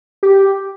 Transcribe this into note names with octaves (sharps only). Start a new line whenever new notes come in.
G4